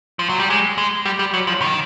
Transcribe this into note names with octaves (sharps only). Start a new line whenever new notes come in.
F3
F#3
G3
G#3
G#3
G3
G3
F#3
F3
D#3